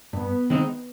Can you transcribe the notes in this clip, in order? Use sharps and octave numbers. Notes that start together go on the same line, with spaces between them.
G2 B3
D#3 G#3 C4 D#4